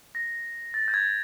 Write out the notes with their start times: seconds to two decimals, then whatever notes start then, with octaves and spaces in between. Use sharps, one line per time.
0.15 A#6
0.74 A6
0.88 G6
0.94 G#6